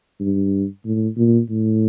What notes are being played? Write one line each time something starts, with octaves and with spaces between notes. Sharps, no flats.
G2
A2
A#2
A2